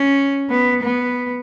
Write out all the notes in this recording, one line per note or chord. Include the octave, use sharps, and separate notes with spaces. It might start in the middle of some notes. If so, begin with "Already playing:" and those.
Already playing: C#4
B3
B3